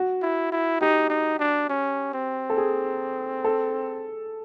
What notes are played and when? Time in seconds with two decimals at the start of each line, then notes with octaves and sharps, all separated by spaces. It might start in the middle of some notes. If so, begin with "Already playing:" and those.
Already playing: F#4
0.22 E4
0.52 E4
0.81 D#4 G4
1.10 D#4
1.40 D4
1.70 C#4
2.14 C4
2.50 A4
2.57 G#4
3.44 A4